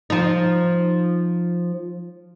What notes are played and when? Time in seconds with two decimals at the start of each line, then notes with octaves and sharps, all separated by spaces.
0.10 F3 D#4